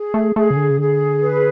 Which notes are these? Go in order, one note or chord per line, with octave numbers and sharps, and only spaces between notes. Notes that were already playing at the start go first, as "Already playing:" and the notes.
Already playing: G#4
A3
A3 G#4
C#3
D3
C#3
D3 G#4
B4